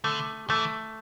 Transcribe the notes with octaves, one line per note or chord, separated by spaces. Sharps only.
D3 A3
E3 A3